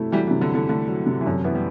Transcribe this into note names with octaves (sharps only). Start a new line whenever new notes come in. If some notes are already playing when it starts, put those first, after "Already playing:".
Already playing: C3 F#3 A3 E4
E3 F#3 G3
E3
C3
D3
E4
D3
D3 A3
F#3
C3
E3
F#2 D3
E3 B3
G3